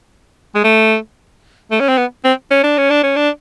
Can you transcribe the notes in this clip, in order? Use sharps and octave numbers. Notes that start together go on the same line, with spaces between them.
G#3
A3
A3
C#4
C4
B3
C4
C#4
D4
C#4
D4
C#4
D4